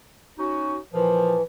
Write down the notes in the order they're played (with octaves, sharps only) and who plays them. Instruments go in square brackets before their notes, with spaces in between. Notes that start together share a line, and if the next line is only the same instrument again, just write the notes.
[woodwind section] C#4 D#4 F#4
[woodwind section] A#2 F3 [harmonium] E3